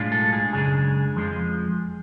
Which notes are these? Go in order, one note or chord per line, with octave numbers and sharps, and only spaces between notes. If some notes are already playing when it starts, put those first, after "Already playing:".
Already playing: B1 A2 G#3 D4 F4
A4
G#4
F#2 C#3 G#3 D4 G#4
F2 F3 G#3